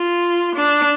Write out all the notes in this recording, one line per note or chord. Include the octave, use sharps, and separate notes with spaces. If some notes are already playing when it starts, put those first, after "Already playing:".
Already playing: F4
D4